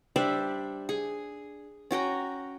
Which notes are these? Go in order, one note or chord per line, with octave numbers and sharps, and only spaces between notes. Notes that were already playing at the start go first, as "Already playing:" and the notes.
G3 D4 C5 E5
G#4
C#4 F#4 G5 A#5